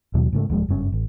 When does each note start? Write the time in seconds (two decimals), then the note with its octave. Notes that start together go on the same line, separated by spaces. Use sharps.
0.14 D#2 B2 F#3
0.32 G#2 C#3 A3
0.49 D#1 F3 G#3
0.68 F#1 G2 D3 C#4
0.92 A1